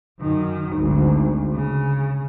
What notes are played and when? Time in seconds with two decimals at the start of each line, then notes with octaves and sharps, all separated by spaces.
0.20 F#2 D#3
0.76 G#1 D2
1.54 C#3